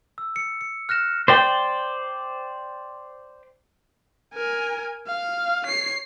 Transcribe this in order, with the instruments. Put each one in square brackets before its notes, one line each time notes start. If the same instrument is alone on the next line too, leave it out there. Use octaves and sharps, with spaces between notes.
[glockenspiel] E6
C#7
C#7
F6 F#6 A#6 E7
[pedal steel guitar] C5 D5 G5
[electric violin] A#4 G#5
F5
C#5 C7